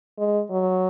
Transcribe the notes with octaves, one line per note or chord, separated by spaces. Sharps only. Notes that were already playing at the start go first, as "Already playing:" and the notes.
G#3
F#3